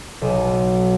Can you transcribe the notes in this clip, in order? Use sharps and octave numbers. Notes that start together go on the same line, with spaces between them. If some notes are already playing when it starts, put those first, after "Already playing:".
B1